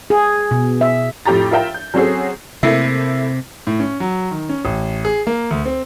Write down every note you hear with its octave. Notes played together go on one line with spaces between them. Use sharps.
G#4
B2
E5
F2 A2 G4 A#5 A6
F4 A#4 E5 G5 A#5
G6
F#3 C4 C#4 F#4 G#4 A4
C3 A3 A#3 E4
A2
C#4
F#3
D#3
C#4
A1
G#4
A#3
D2
C4